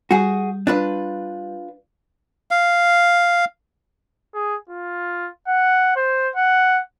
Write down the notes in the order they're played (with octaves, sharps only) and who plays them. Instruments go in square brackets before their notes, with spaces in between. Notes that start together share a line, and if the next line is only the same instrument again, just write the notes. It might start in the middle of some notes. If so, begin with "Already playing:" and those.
[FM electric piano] G3 [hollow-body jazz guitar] F#4 G#4
[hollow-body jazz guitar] D4 F4 B4
[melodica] F5
[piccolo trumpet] G#4
F4
F#5
C5
F#5